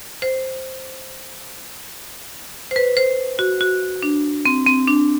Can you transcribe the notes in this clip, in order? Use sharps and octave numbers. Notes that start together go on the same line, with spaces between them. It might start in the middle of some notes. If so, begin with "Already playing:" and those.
C5
C5
B4
C5
F#4
F#4
D4
C4
C4
D4